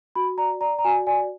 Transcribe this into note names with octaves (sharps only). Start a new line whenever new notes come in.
F#4 B5
D5 A#5
D5 A#5
A#5
F#4 G#5
D5 G#5